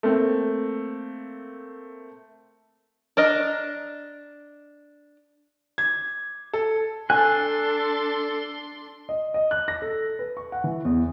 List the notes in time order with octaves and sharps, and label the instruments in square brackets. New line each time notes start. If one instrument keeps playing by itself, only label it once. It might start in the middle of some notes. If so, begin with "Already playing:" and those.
[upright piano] A3 A#3 C4
[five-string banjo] D4 A#4 D#5
[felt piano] G#6
A4
[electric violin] D4 C6 [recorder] A4 [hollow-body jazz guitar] G#5 [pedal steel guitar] F#6
[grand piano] D#5
D#5
F#6
A#6
A4
B4
C#6
F#5
E3
E2